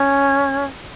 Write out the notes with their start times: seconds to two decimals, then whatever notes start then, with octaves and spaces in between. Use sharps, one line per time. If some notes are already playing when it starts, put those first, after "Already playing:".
Already playing: C#4